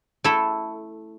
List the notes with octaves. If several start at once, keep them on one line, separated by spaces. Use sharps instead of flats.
A3 E4 A4